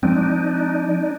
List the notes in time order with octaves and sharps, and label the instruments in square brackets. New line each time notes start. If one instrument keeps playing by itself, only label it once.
[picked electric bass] F3 G#3 C4 [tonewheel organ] D4 D#4